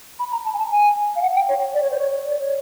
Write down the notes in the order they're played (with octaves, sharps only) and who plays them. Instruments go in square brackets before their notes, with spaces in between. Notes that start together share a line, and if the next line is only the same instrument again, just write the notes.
[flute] B5
A#5
A5
G#5
A5
G#5
F5
F#5
G5
C#5
D5
C#5
C5
C#5
D5
C#5